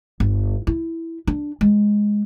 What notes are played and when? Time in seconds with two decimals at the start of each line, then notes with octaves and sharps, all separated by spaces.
0.20 G1
0.67 E4
1.27 D4
1.61 G#3